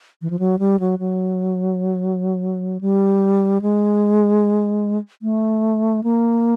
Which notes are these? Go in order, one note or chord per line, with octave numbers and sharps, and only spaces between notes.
E3
F3
F#3
G3
F#3
F#3
G3
G#3
A3
A#3